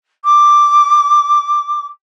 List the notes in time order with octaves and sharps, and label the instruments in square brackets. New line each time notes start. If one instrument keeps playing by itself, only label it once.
[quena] D6